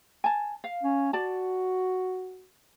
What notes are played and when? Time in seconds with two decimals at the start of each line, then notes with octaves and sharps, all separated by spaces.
0.24 G#5 A5
0.64 F5
0.83 C#4
1.13 F#4 D5 A5